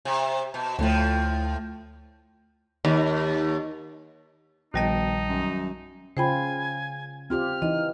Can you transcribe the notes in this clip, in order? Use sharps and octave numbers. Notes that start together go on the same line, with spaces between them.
C3
B2
D2 A2 F3 A3
D#2
A#1 B2 D#3 G3 D#4 D#5 G5 A5
F#2
C#3 F4 C5 G5 G#5 B5
C4 F4 G4 F6
E3 D#4 D#5